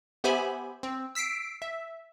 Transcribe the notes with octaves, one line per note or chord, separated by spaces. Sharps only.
B3 G4 C5 E5 G#5 B5
C4
E6 B6 C7 D7
E5